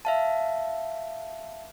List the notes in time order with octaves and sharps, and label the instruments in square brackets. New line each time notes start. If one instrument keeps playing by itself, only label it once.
[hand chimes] E5 F5 A5